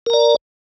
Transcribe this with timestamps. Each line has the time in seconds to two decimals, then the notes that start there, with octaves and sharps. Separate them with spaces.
0.06 A#4
0.10 A#5
0.13 D5